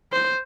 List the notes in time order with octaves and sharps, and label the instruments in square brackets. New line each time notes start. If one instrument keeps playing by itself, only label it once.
[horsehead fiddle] C5